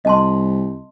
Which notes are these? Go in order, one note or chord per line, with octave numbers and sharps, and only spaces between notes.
C2 D#5 A5 C6